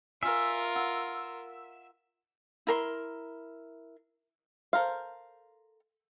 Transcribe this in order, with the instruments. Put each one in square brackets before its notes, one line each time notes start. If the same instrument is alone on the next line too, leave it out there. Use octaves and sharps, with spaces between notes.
[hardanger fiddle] F4 A#4 [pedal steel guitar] E5 [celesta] G#5 F6
[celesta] F#5 E6
[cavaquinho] E4 A#4 C6
[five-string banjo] A4 A#4 C5 F5